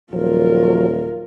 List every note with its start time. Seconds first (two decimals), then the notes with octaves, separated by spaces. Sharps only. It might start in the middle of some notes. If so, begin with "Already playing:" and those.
0.13 D#1 F3 F#3 F4 A#4